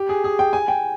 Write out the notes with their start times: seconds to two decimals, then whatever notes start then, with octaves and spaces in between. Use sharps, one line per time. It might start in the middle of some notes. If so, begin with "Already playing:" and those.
Already playing: G4
0.09 G#4
0.24 G#4
0.39 G5
0.53 G#5
0.68 G5